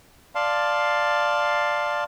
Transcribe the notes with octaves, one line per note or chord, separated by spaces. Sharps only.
D5 F5 A5 C6